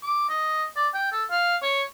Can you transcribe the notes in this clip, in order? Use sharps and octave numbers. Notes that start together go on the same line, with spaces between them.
D6
D#5
D5
G5
A4
F5
C#5